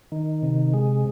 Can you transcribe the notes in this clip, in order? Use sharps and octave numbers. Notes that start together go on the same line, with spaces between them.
D#3
C3
G#3